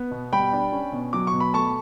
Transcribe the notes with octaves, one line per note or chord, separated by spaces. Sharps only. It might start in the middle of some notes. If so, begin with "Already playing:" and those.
Already playing: B3
B2
G3 G5 B5
D4
C#4
B2
F#3 D6
C#6
B2
B5
A3 A5 C#6